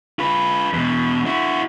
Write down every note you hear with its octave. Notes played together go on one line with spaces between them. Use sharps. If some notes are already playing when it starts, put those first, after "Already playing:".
F4 B4
E2 B2
E4 F#4